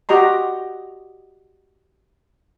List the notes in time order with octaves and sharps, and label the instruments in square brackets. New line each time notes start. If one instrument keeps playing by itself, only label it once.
[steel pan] F#4 G4 D#5 A#5 C6